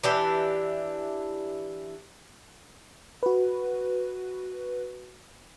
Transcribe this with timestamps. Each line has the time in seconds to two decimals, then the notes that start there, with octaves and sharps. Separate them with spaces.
0.04 E3 D4 G4
3.23 F#4 B4